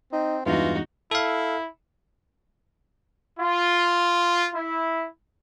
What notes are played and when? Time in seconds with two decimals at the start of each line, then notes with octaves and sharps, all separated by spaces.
0.12 C4 D#4
0.46 E2 G2 E3 G#3 D#4 F4 F#4
1.11 E4 A4 F5
3.39 F4
4.53 E4